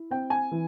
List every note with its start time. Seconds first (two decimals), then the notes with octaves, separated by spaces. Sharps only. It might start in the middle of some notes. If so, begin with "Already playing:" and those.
Already playing: E4
0.11 C4 G5
0.30 G#5
0.52 E3